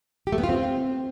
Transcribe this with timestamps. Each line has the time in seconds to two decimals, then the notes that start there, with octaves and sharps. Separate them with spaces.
0.27 G4
0.32 A3
0.38 B3
0.44 F4
0.49 C4